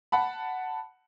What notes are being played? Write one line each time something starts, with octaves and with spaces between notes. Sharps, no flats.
F#5 A5 B5